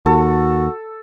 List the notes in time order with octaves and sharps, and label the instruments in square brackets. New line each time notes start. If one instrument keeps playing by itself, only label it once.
[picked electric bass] D#2 [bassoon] F#4 [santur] A4